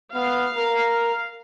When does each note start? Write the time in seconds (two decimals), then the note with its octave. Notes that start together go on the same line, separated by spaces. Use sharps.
0.14 B3 F5
0.56 A#4